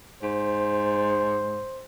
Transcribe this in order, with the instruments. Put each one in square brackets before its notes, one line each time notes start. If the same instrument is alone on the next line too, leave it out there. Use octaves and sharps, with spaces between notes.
[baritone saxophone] G#2 [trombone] C5